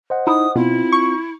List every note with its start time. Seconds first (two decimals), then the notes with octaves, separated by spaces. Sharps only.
0.10 C5 D#5 F#5
0.27 D#4 E4 D#6
0.56 B2 C4 E4 F4
0.92 C#6